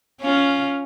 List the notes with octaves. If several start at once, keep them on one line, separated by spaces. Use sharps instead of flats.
C#4 F4